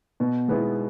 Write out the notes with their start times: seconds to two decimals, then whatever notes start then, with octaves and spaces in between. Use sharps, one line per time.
0.20 B2
0.48 G#3 B3 E4 G#4